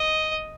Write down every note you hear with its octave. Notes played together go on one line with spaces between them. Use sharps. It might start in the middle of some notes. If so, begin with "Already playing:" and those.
Already playing: D#5